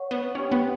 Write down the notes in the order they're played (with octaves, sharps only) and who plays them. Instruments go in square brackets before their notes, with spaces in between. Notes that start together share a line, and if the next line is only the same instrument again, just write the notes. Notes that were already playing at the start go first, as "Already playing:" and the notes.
Already playing: [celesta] C#5 F#5 C#6
[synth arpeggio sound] B3
[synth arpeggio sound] C#4 [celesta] D4 G4 C#5 G5
[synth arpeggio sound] B3